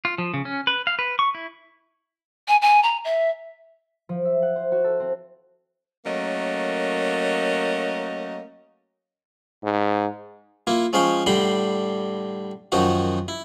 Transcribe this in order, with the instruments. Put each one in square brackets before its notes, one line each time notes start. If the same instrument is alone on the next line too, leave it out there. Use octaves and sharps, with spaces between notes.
[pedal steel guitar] F4
F3
C#3
C#4
B4
F5
B4
C#6
E4
[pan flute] G#5
G#5
A#5
E5
[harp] F3
E5
F#5
C5
F#4
A4
C4
[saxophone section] F#3 A3 A#3 C#4 A#4 D#5
[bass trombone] G#2
[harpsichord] A#3 E4 F4
F3 G#3 C#4 C#5 F5 G5
A2 D3 G3 G5 B5 C6
F#2 D#3 F3 D#4 F#4
E4